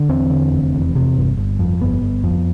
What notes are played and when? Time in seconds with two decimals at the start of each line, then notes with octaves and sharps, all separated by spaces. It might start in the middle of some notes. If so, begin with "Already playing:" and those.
Already playing: D3
0.09 E2 C4
0.30 D3
0.53 F1
0.74 E2
0.95 C3
1.17 G1
1.37 G1
1.59 F2
1.81 G1 B3
2.01 G1
2.24 F2